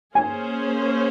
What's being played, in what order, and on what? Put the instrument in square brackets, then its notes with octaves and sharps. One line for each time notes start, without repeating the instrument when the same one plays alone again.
[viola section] A#3 C#4 G#4 C5 [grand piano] G#5